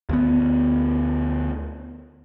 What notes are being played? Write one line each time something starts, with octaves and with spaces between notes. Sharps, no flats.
D2 B3